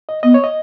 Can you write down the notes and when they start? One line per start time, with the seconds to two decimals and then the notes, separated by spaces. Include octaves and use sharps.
0.09 D#5
0.23 B3 D#5
0.34 C#5
0.44 D#5